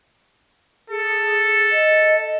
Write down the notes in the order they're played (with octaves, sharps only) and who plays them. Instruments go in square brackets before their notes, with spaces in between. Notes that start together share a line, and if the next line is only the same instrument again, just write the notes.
[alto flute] G#4 [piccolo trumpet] A4
[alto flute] D#5